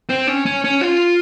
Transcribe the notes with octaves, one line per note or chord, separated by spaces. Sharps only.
C4
C#4
C#4
C#4
F4